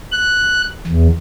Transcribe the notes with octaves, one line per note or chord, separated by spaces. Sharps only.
F#6
E2